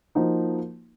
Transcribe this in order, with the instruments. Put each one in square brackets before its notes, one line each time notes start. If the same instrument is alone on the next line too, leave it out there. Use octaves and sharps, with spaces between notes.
[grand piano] F3 A#3 D#4 F#4